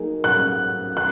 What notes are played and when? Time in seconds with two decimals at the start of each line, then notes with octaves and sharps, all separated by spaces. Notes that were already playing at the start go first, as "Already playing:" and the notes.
Already playing: F#3 A#3 D#4 G#4
0.24 F#6
0.97 F#6